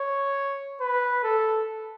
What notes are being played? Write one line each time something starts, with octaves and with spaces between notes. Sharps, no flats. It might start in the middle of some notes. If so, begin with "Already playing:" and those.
Already playing: C#5
B4
A4